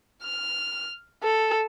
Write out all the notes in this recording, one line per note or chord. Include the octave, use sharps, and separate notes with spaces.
F6
A4